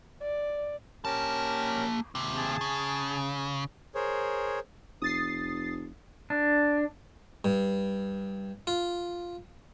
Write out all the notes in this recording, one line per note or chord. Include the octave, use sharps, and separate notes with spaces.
D5
A#3 C#4 G4 A#4 A5
D#2 C3
G#4 A5
C#3
G#4 A#4 C5 C#5
F1 D#6 A6 C7
D4
G2
F4